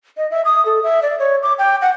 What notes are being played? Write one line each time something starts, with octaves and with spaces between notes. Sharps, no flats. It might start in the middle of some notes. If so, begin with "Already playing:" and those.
D#5
E5
D#6
A4
E5
D5
C#5
D6
G5
F#5